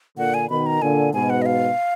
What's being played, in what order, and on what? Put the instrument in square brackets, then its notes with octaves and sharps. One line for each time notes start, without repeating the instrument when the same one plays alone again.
[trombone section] A#2 D3 [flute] F#5
[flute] G#5
[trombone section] B2 D#3 [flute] B5
[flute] A#5
[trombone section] A#2 D3 [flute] G#5
[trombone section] G#2 B2 [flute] G#5
[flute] F#5
D#5
F5